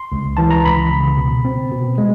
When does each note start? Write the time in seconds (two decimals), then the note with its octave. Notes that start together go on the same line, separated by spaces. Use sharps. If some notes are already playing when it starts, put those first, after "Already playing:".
Already playing: C6
0.12 C#2
0.37 E3 A5
0.51 A#5
0.65 C#2 B5
0.91 C#3
1.17 B2
1.45 C4
1.71 B2
1.98 G#3